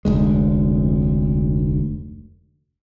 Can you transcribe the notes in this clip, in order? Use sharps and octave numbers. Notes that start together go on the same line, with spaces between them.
F1 D2 G#3